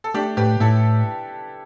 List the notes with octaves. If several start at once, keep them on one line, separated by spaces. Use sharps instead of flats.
A4
A3 D4 G4
A2 G4 B4
A2 E4 A4